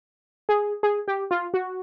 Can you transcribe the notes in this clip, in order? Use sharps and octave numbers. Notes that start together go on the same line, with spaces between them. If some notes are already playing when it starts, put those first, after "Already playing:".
G#4
G#4
G4
F4
F#4